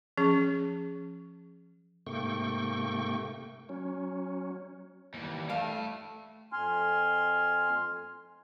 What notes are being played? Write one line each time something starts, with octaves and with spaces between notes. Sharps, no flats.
F3 C#4 G#4
G#2 C3 A3 A#3 G5 C#6
F#3 C#4
D#2 E3 G3
A3 F5 G5 A5
F2 G#5 C6 F6